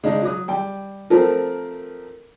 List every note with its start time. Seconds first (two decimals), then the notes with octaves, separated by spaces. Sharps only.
0.03 C#3 G#3 D4 D#4
0.22 F#3 D#6
0.48 G3 G5
1.10 F3 A3 C4 A#4